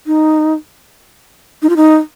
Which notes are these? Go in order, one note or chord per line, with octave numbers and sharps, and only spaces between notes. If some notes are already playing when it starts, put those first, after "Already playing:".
D#4
D#4
F4
D#4